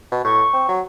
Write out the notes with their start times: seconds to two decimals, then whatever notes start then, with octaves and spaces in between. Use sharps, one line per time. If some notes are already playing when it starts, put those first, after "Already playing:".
0.12 B2
0.25 A2 C#6
0.53 C4
0.69 F#3